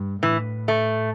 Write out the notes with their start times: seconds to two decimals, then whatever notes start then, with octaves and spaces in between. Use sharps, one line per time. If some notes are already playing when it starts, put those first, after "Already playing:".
Already playing: G2
0.23 A2 E3
0.68 A3